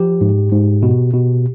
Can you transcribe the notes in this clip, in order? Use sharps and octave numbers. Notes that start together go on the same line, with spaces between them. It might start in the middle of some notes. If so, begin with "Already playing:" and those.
Already playing: F3 G4
G#2
G#2
B2
B2